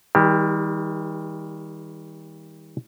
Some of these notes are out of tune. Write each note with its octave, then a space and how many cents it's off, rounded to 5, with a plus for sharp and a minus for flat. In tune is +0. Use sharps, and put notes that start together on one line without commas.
D#3 +40 G3 +30 G4 -20